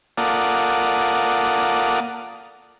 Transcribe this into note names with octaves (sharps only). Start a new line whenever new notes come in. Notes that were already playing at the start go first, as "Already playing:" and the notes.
A#3 F4 A4 D5 F#5 D#6